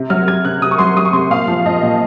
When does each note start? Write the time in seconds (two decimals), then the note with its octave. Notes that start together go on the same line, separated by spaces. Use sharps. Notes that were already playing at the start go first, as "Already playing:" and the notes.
Already playing: C3
0.10 F#3 F6
0.27 F#3 G#6
0.45 C3 F#6
0.61 C3 D#6
0.71 C#6
0.79 F#3 C6
0.97 F#3 D#6
1.05 C#6
1.13 C3 C6
1.30 A#2 F5
1.48 F3
1.65 F3 D#5
1.83 A#2